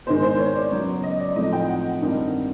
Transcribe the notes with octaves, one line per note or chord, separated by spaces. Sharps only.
G#2 D#3 G#3 B3 C5
C5
C#5
D5
C#3 F#3 B3
D#5
D5
A2 F3 A3 C4 D#4 D#5
G5
F#5
G2 D#3 G3 C4 D#4